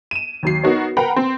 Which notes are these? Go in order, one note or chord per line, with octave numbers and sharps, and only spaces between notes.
D#7 E7
D#2 F#3 C7
B3 D#4 F#4 A#4 C#5
A#4 B4 F#5 G5 A#5 B5
C4